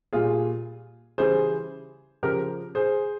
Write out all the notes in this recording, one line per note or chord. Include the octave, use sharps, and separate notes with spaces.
A#2 G3 F4 G#4
C#3 E3 G3 G#4 C5
C#3 F3 G4 A#4
G#4 C5